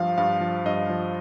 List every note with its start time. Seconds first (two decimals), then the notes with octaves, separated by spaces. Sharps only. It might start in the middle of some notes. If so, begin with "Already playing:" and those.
Already playing: G2 F3 F5
0.18 G2 F5
0.41 F3
0.66 G2 D#5
0.90 F3